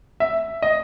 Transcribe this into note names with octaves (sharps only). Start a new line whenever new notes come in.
E5
D#5